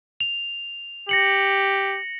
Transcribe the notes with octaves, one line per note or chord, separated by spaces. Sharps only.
F7
G4 A#6 C#7 F#7